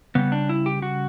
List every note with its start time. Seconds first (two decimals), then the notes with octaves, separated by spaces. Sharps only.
0.15 C#3 G3 B3
0.32 D4
0.49 E4
0.66 G4
0.82 F#4